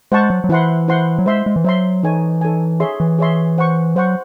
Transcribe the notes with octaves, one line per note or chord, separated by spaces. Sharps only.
G#3 C5 F#5 A5 C#6
F#3
F#3
E3 E4 C5 F#5 C6
E4 C5 F#5 C6
F#3
G#3 C5 E5 C6
G#3
E3
F#3 C5 E5 C6
E3 D#4 A4 C#5 G#5
D#4 A4 C#5 G#5
G#4 C#5 E5 C6
E3
G#4 C#5 E5 C6
C5 F#5 C#6
F#3 C5 F#5 C#6